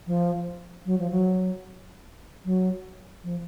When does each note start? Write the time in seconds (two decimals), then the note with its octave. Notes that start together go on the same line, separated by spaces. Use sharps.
0.07 F3
0.86 F#3
0.99 F3
1.10 F#3
2.45 F#3
3.24 F3